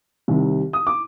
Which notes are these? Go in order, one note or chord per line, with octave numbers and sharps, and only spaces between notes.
C2 C3 D#3
D#6
D6